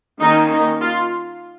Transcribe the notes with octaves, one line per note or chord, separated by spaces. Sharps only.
D#3 A#3 C#4 D#4
D#4
F4